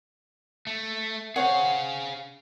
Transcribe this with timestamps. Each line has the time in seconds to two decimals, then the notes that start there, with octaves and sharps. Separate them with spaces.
0.67 A3
1.36 G#4 C5 C#5 F5 F#5